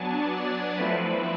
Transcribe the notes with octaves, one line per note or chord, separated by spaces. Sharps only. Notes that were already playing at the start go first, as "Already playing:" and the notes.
Already playing: F#3 B3 D4 G#5 A5
D5
F3 A3 C4 E4 B4